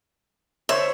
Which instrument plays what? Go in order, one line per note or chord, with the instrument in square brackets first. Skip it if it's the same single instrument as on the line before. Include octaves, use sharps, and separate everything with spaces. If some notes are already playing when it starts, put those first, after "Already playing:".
[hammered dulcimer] C5 C#5 C6 [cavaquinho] E5